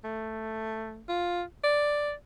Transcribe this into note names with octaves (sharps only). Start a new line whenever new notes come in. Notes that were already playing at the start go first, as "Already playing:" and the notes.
A3
F4
D5